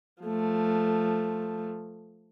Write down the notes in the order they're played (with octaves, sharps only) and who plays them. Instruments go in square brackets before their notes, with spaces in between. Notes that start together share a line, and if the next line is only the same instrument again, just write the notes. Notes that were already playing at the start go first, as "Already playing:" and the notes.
[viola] F3 A3